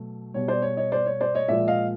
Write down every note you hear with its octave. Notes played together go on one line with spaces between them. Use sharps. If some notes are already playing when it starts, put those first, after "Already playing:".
Already playing: B2 F#3 A3
B2 G3 C#5
C5 D5
C#5
C#5 D#5
C5 D5
C#5
C5 D5
C#5 D#5
A#2 F3 G#3 D5 E5
D#5 F5